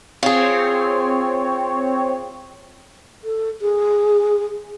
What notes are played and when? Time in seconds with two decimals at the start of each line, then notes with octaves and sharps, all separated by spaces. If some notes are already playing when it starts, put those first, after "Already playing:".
0.23 C4 F4 G#4 C#5
3.24 A4
3.61 G#4